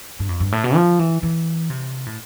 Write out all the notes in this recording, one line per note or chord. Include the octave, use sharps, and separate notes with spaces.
G2
F2
G2
A2
B2
F3
E3
E3
C3
A2